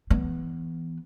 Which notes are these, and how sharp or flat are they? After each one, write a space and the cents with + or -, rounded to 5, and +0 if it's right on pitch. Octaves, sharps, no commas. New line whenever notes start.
E3 +0 B3 +5